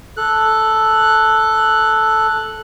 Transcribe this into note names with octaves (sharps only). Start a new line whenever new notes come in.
A4 F#6